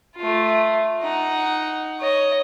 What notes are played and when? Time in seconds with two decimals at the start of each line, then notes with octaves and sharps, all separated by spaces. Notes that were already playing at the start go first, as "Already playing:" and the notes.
0.16 A3 F4
1.01 D#4 F#5
2.00 C#5 D#5